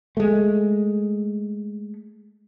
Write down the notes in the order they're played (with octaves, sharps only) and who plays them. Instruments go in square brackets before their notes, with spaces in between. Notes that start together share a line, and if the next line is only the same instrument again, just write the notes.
[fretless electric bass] G#3 A3